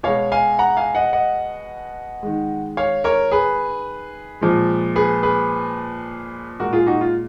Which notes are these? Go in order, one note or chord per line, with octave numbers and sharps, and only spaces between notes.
B2 G#3 C#5 F5
F5 G#5
F#5 A#5
F5 G#5
D#5 F#5
D#5 F#5
D#3 G#3
C#5 F5
A#4 C#5
G#4 B4
A#2 F3 G#3
G#4 B4
G#4 B4
A#2 G#3 F#4 A#4
F4 G#4
D#4 F#4
F4